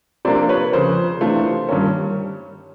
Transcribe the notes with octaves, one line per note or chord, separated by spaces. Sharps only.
C3 F3 A#3 D4 C5 D5
B4 C#5
F2 C#3 F3 A#4 C5
C3 E3 A3 D4 F4
G2 D#3 G3 A#3 C#4